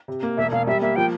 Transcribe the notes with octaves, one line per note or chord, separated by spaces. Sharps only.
C3
A#3
E1 E5
E1 F5
G3 E5
A#3 E5
F3 G5